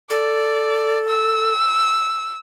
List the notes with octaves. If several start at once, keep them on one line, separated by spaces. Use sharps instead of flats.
A4 D5
E6